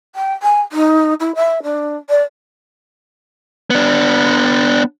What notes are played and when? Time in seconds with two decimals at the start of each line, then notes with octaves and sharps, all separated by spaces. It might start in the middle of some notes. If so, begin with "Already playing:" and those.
0.16 G5
0.43 G#5
0.72 D#4
1.20 E4
1.35 E5
1.63 D4
2.10 D5
3.70 B3 D4